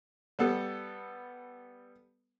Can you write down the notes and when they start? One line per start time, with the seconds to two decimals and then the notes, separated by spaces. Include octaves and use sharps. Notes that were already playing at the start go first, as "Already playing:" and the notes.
0.39 G3 B3 A4